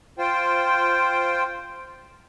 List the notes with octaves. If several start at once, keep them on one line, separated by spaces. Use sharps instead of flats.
F4 C5 G5